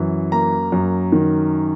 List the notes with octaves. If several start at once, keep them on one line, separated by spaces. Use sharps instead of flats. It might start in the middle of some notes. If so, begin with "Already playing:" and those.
Already playing: F#2 E3
A#3 A#5
F#2
D#3